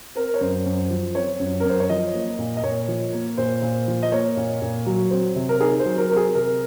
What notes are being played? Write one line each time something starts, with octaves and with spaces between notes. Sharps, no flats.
C4 A#4
C#5
F#2 C5
F#2
F3
C4 C#5
F#2
A#4
F#2 C5
C#5
F3 D#5
A#3
A#2
D#5
A#2 C#5
F3
A#3
A#2 C5
A#2
F3
D#5
A#3 C#5
A#2
A#2
F#3
C4
C3
A#4
D#4 G#4
C5
F#3
A#4
C4 A#4
G#4
C3 A#4